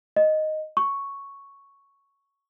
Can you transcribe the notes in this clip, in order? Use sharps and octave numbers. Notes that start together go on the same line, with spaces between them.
D#5
C#6